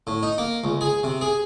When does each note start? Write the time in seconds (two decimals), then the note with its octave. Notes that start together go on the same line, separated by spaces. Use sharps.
0.07 A2
0.23 D#4
0.38 A#3
0.64 C#2
0.81 G#4
1.03 C3
1.21 G#4